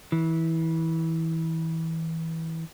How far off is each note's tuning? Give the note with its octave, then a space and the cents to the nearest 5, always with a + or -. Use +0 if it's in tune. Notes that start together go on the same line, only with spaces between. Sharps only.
E3 -20